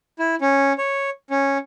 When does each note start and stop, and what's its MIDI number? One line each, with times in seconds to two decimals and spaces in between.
0.19 0.35 64
0.41 0.73 61
0.78 1.10 73
1.30 1.58 61